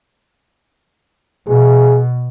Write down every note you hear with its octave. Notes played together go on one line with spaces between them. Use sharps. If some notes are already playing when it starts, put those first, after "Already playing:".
B2 G#4